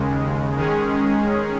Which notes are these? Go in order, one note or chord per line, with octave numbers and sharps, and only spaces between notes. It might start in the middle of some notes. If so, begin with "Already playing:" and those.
Already playing: D#2 C#3 G#3
D#3 G#3 C#4 G#4